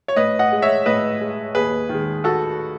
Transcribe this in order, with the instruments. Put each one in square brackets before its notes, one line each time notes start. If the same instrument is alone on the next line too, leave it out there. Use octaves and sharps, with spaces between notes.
[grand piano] C#5
A2 B4 D#5
D#5 F#5
G#3
C#5 E5
A2 B4 D#5
G#3
D#2 G#4 B4
D#3 G#3
F#4 A4